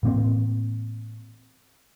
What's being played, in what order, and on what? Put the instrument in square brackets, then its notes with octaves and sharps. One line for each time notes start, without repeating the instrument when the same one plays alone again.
[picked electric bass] A2 E3 A#3 C4